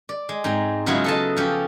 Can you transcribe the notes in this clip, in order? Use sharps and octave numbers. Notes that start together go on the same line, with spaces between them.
D5
G#3
G#2 C4 A#5
C#3 F#3 G#3 B3 E4 F4
A4 D#5 A5
F3 C#4 G4